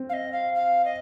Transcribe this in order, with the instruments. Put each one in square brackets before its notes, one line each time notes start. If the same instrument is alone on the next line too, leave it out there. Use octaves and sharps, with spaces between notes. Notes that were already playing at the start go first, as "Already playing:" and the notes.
Already playing: [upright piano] C4
[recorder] F5
D#5
F5
F5
D#5